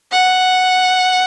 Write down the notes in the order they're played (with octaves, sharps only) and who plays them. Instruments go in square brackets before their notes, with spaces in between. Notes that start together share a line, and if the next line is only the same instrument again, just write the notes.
[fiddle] F#5